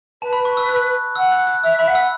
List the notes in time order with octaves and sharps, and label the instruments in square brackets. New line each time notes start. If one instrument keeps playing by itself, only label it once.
[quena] B4 [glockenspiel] A5
[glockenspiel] B5
C#6
E6
F#6
[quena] F#5 [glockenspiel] E6
[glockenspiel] F#6
F#6
[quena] E5 [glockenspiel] E6
[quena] E5 [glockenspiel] B5
[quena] F#5
[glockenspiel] E6